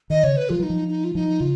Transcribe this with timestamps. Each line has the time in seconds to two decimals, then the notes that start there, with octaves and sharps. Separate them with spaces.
0.10 D#3 D#5
0.24 C#3 C#5
0.37 B4
0.49 F3 F4
0.60 F#3 D#4
0.70 F3
0.88 D#4
1.04 F4
1.15 F3 D#4
1.40 C#3 F4